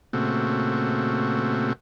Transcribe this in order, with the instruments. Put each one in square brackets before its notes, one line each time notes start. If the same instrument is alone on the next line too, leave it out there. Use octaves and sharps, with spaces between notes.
[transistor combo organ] A#2 C#3 A3 C4 F#4